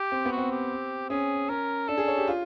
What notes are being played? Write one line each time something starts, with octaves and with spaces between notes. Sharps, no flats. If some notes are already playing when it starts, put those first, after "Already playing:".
Already playing: G4
C4
B3
F#4
C4
G4
C#4 G#4
C#4 A#4
D4 A4
G#4
C#5
G4
F4